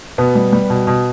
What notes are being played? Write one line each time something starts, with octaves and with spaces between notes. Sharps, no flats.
B2 B3
G3
G3
B2
B2